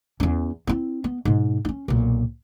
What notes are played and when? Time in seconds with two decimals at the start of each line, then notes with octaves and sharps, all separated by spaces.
0.20 E2 C#4
0.67 C4 E4
1.04 B3
1.25 G#2 B2
1.65 C#4 D#4
1.88 B1 A#2